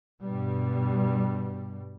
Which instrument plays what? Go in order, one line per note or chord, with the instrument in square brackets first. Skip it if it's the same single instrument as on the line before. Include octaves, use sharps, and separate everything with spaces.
[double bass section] G2 B2 G3